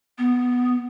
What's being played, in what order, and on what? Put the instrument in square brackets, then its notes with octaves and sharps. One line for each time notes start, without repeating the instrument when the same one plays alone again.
[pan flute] B3